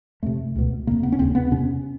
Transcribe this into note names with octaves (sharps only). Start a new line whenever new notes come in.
F2 C3 A3
C#2 B2
F2 C#3 A#3
B3
C#4
D#2 C#3 C4
B3
E2 C3 C#4